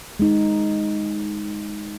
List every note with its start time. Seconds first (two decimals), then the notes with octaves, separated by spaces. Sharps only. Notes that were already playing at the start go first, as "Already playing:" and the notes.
0.19 G#3 D#4